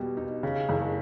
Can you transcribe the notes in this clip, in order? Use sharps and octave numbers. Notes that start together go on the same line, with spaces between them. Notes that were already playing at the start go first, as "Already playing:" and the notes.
Already playing: B2 G3 A#3
D#4
C#3
F#1